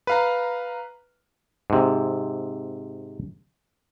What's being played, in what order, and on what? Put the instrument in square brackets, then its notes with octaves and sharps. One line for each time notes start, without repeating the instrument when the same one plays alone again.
[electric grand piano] B4 F5 A#5
[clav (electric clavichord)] G#2 C3